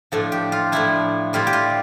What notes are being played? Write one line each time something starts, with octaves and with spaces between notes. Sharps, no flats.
A2 F3 A3 D4 A4
G4
F4
A2 F3 A3 D4 E4
A2 G3 C4 E4 F4
G4
F4